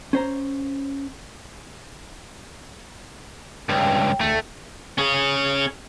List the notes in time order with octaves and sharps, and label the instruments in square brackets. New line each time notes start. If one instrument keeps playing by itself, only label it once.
[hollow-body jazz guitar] C#4 C5 A#5
[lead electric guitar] C#2 G2 [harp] G5
[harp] E1 D2 [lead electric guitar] A3
[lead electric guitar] C#4 G#4